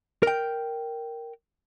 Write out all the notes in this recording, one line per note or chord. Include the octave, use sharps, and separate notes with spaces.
A#4 G5